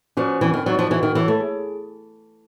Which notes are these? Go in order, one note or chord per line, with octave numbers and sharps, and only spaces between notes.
F3 C#4 F#4 B4 D5
E3 C4
D#3
F#3 D#4 F#4 B4 D5
F3
E3 F#4
D#3
E3 A4 C#5
A3
G#4